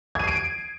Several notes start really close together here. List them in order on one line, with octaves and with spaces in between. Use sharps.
G#6 D#7 C7 D7